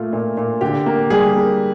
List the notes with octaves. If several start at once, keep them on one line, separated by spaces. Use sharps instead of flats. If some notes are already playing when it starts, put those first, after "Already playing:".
Already playing: A#2 A3 F4
A#2
A#2
D3 G4
A#3
G3 G#4
A#3